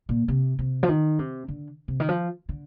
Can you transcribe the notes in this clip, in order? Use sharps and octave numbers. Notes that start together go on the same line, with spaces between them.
A#2
C3
C3
F3
D#3
C3
D3
C3
D#3
F3
D3